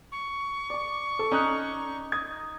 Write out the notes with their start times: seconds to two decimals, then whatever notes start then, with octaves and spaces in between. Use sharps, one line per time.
0.12 C#6
0.70 D5 D6
1.19 A4
1.31 C#4 D#4 D5 D#6 F#6
2.12 D#5 G#6